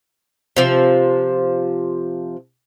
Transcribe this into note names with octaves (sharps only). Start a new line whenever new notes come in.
C3 F3